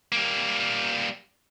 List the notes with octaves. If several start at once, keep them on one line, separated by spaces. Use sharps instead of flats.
G3 A#3